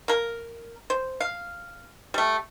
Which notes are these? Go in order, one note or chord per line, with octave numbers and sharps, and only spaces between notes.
A#3 A#4
C5
F5
G3 A3